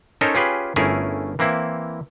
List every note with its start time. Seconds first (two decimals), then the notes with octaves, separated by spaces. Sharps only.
0.21 C#4 D#4 A4 A#4 C5 C#5
0.35 C#4 F4 G4 G#4 B4
0.76 G1 A3 C#4 E4 G#4 A#4
1.39 E3 A#3 C4 E4